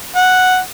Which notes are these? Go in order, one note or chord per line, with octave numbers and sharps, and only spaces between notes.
F#5